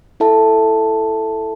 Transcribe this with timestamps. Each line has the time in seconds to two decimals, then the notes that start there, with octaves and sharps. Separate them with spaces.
0.20 E4 A4 E5 A5